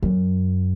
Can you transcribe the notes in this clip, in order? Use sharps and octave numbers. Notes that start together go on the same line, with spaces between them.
F#2